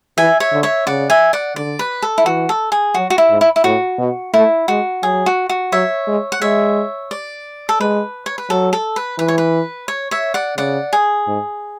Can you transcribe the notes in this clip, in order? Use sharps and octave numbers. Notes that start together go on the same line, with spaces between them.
E3 E5 G#5
C#5 E5
D3
C#5 E5
C#3 D5 F#5
E5 G#5
D5 F#5
D3 D5
B4
A4
E4
E3 F#4
A4
G#4
F#3 F#4
F#4
E4
G#2
E4
E4
A2 F#4
B2
A3 E4
G#3 F#4
F#3 G#4
F#4
F#4
F#3 C#5 E5
G#3
F#5
G#3 C#5 E5
D5
A4
G#3 B4
C#5
B4
F#3 A4
A4
B4
E3 B4
C#5
B4
C#5
C#5 E5
D5 F#5
C#3 D5 F#5
G#4
G#2